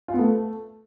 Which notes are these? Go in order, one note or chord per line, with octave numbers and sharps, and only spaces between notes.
F4
B3
A3